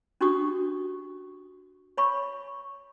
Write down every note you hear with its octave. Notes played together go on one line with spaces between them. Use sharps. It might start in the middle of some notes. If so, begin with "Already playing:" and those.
C#4 D4 F#4 G4 C#6 D#6
C#5 B5 C#6